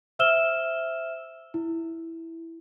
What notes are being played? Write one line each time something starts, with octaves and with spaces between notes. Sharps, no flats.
C5 E5 E6 F6 E7 G7
E4